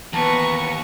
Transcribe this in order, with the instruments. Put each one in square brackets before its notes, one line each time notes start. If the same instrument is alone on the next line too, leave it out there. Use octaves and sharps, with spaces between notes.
[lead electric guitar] D#2 [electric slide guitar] E3 A5 [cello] B3 B4 [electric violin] A#5 C#6